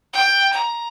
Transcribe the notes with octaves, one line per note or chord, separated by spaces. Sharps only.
G5
A#5